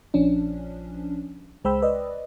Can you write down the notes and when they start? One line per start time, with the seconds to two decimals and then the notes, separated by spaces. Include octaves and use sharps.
0.14 A#1 F3 C#4 D4
1.64 C#2 G#3 C5 G5 B5 E6
1.82 B4 D5 D#5